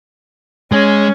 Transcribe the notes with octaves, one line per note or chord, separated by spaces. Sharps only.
G#3 C#4